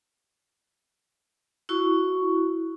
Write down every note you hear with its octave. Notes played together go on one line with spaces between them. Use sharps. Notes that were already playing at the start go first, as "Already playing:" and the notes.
E4 F#4 C#6